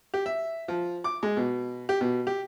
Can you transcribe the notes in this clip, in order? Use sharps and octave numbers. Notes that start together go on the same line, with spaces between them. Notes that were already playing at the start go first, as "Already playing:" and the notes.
G4
E5
F3
D6
G#3
B2
G4
B2
G4